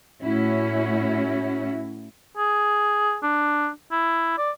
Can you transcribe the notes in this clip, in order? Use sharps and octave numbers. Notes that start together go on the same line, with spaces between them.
A2 C#4 E4 F#4 C#5
G#4
D4
E4
D5